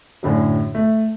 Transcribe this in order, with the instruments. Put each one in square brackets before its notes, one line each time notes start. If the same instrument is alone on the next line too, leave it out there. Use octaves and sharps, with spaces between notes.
[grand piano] F#2 A2 D3 F#3
A3